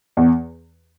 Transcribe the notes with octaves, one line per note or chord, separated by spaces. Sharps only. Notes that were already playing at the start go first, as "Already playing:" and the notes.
E2